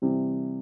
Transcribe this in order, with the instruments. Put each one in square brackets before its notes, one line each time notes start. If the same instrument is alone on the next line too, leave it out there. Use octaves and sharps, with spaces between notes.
[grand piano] C3 E3 G3